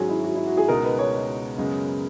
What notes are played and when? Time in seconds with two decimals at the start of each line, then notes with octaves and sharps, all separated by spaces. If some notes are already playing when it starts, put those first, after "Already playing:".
Already playing: G#2 F#3 C#4 F#4 G#4 C#5
0.09 E4
0.24 F#4
0.35 E4
0.47 F#4
0.57 G#4
0.68 C#2 B2 G#3 D#4 A#4
0.84 B4
0.99 C#5
1.58 F#2 C#3 G#3 B3